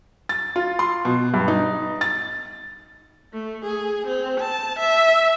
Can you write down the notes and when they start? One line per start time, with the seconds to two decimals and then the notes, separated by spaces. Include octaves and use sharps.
0.29 A6
0.56 F4
0.79 C6
1.05 B2
1.34 G2
1.48 D#4
2.01 A6
3.33 A3
3.65 G#4
4.07 C4
4.40 A5
4.79 E5